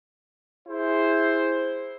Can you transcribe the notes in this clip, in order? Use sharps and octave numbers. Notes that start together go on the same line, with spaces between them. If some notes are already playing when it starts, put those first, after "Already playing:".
E4 G#4 C5